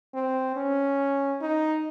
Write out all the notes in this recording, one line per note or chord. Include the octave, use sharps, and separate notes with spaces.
C4
C#4
D#4